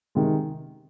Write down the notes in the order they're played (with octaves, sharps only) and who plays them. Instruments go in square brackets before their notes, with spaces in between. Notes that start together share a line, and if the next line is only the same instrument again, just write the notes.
[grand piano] C3 D#3 G#3